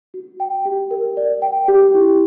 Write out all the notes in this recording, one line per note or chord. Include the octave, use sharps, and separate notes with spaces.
F#4
G5
G4
A#4
D5
G5
G4
E4